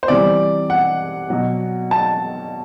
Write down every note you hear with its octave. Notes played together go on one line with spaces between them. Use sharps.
C5
C3 E3 G3 D5
F#5
B2 F#3
A5